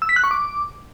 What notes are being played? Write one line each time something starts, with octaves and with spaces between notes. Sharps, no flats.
E6
B6
F#6
C#6
D6